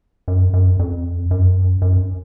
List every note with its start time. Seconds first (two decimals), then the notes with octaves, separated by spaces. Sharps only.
0.28 F#2
0.54 F#2
0.79 F2
1.31 F#2
1.82 F#2